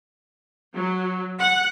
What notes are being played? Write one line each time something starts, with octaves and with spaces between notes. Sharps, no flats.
F#3
F#5